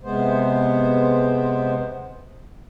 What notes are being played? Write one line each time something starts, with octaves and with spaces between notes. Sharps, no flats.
C3 G#3 B3 C5